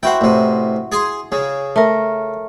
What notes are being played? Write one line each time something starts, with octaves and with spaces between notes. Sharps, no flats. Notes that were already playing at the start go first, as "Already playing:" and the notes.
E4 F#4 C5 F#5 G5
A1 C3
G#4 G#5 C6
C#3 G#4
A3 A#4